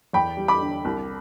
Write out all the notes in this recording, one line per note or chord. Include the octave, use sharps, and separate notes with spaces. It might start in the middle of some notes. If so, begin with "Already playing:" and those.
E2 G5 B5
G3
B5 D6
D3
C2